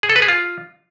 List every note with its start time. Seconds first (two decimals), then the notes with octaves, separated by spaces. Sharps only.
0.03 G#4
0.10 A4
0.16 B4
0.22 G#4
0.28 F4